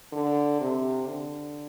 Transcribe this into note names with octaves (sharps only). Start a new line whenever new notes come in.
D3
C3
D3